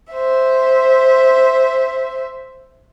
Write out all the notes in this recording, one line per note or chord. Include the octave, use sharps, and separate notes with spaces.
C5 E5